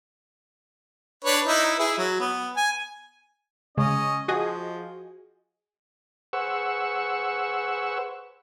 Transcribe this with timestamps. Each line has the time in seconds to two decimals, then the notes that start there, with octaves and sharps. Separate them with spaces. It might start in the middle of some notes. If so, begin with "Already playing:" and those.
1.24 D4 B4 C#5
1.46 D#4 E4 B4
1.79 E4 G#4
1.98 F#3
2.20 B3
2.57 G#5
3.78 C#3 G#3 C#4 D#5
4.28 F3 F#4 G#4 D#5
6.33 G#4 B4 C5 F#5 C#6 E6